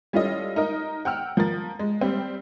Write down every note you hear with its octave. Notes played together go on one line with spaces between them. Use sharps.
G3 C#4 E4 F4 A4 D#5
D#4 A#4 D#5
F#5 G5 E6 F6
F3 A#4 A6
G#3
G3 C4